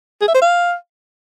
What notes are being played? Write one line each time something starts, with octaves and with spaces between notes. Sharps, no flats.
G#4
E5
C5
F5